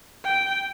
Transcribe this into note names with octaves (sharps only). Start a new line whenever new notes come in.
G5